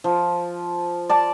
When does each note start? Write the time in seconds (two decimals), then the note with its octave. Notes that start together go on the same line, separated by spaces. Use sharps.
0.04 F3
1.09 D5 A5